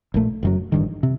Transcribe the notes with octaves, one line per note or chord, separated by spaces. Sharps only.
A#1 A#2 A3
F#1 F#2 F#3
A1 G2 D#3
C3